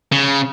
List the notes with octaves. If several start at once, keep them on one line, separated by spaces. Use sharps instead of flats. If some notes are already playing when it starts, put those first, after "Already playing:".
C#3